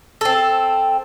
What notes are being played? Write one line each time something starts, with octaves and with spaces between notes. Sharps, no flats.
C4 A4